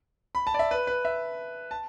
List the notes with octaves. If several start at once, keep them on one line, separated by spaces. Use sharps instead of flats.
B5
A5
D5
E5
B4
B4
E5
A5